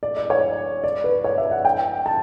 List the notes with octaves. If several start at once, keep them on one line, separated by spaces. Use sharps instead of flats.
D5
D5
C#5
D5
B4
C#5
E5
F#5
G5
A5